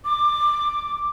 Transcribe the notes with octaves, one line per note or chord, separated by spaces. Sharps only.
D6